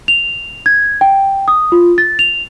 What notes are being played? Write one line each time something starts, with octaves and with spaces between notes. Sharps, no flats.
F7
G#6
G5
D#6
F4
A6
F7